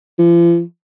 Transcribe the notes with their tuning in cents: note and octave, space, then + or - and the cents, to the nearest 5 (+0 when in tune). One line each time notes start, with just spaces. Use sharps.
F3 -45